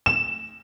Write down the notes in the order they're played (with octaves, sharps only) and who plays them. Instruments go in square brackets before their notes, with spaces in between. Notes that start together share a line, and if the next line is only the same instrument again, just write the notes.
[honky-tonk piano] E7